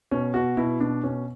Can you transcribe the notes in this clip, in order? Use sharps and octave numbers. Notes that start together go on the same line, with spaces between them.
B2 C#4
B2 F#4
B2 E4
B2 D4
B2 C#4